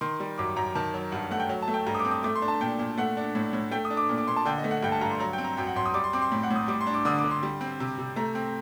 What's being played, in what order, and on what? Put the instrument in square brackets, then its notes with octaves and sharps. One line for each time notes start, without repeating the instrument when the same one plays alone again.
[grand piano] D#3 C6
G3
F#2 D6
F#2 A#5
D#3 A5
F#3
G2 F#5
A3 F#5
G5
F#3
A5
A3
G5
G2 A#5
D#6
D6
C4
D#6
A3 D6
C6
D4
A5
A#2 G5
A#2
A3 F#5
D4
A2
A2
A3 G5
D#6
D4
D6
A#2
D6
A#2 C6
A5
D3 G5
D#5
A3
F#5
G2 G5
A5
G2 A#5
C6
F#3 A#5
G5
C4
A#5
F#2 G5
F#5
F#2 C6
D#6
G3 D6
C6
C4 D6
C6
A2
F#5
A2
D#6
G3 D6
C6
D4
D6
D3 D#6
D6
D3
C6
G3
C4
C3
C3
A3 A#5
C4